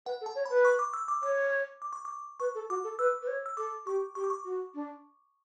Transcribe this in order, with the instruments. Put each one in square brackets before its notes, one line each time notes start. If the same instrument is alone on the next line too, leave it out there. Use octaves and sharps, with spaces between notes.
[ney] B4 [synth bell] F#5
[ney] A4
[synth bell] A5
[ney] C#5
[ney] B4 [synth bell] B5
[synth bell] C#6
D6
E6
D6
[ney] C#5 [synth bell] D6
[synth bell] D6
C#6
D6
[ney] B4 [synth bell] C#6
[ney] A4
[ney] F#4 [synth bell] D6
[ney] A4
[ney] B4 [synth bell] E6
[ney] B4
C#5
[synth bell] E6
[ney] A4 [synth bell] D6
[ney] G4 [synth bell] C#6
[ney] G4 [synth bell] C#6
[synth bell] D6
C#6
[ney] F#4
D4